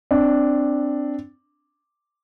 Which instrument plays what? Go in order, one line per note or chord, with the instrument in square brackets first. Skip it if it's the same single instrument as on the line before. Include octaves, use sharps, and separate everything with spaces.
[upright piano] C4 D4